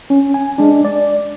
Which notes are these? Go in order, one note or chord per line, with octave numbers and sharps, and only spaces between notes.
C#4
G#5
G#3 D4
D5